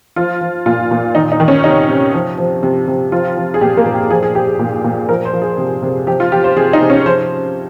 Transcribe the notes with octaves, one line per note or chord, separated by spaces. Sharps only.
F3 F4
F3
A#2 F4
A#2
D#3 D#4
D#4
D#3
C#4
C3 D#4
C3
F3
F3
C3
C3
F3 F4
F3
G#4
A#2 G4
A#3
A#2
G4
F3 G#4
G#4
F3 G4
G#4
A#2
A#2
F3 A#4
C5
F3
G#4
C3
C3
F3 G4
F4
F3 G4
C5
C3 G#4
D#4
C3
C#4
F3 C5